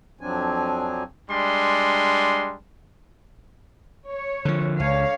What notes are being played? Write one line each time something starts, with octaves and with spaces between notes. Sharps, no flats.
F2 F3 F#3 C4 D4 G#5
G3 G#3 D4 C6
C#5
D3 F3
C#2 D3 C#5 F5